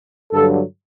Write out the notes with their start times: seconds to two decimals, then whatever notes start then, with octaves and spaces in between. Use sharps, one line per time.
0.32 G2 D3 F#3 A4